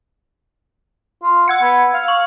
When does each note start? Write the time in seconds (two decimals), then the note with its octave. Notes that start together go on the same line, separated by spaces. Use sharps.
1.22 F4
1.48 F#5 E6 G#6 C#7
1.62 B3
1.94 F5
2.08 C#6